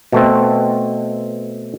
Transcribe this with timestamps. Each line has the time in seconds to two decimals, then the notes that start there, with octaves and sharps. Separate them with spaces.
0.13 B2 A3 C4